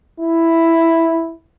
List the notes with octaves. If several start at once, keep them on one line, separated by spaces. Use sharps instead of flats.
E4